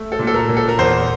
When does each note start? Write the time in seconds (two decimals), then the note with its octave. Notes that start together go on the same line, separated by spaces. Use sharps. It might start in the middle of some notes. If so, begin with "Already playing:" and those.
Already playing: A3
0.12 A4
0.19 A#2
0.27 A4
0.34 A#4
0.49 A#2
0.57 A4
0.69 A#4
0.79 E2 C5